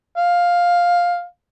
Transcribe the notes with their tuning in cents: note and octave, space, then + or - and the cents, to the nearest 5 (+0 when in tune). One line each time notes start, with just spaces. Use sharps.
F5 +10